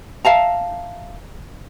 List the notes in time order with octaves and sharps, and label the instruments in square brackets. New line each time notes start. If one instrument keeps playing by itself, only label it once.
[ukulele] E5 F5 A5 A#5